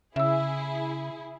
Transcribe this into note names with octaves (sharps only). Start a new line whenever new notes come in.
C#3 E4 G#4 E5 E6